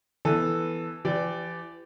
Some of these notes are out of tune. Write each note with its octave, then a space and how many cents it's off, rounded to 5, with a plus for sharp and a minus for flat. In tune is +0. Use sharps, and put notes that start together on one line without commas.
E3 +0 B3 +5 A4 +0
E3 +35 G4 +0 D5 +0